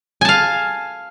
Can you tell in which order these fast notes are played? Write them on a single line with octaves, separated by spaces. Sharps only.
G#5 A5 F5